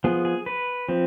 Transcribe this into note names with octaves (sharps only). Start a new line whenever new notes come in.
F3 B3 G#4
G#4
B4
F3 C4